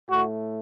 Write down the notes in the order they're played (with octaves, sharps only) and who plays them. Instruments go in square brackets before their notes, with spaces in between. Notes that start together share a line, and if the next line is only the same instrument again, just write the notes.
[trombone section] A2 A3 F#4